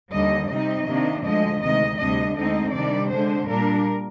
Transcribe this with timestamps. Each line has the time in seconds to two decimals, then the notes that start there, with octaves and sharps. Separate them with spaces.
0.12 D#2 D3 G3 D#5
0.49 C3 G3 C4 D#4 D#5
0.87 C3 D#3 A#3 D4
1.24 D2 D3 F3 G#3 D#5
1.61 D2 C3 D#3 G#3 D#5
1.99 D2 C3 G3 D4 D#5
2.36 D2 D3 G#3 C4 D#4 D#5
2.73 C3 D#3 G3 D4 D5
3.10 D3 G#3 D4 C5
3.48 A#2 G3 D4 A#4